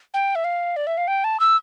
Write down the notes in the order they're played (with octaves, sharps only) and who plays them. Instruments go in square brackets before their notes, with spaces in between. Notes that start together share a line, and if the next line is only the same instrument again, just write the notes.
[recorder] G5
E5
F5
D5
E5
F5
G5
A5
E6